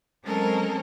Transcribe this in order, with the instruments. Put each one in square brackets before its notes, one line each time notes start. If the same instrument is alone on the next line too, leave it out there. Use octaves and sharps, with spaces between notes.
[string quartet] F#3 G#3 C4 C#4 A4 A#4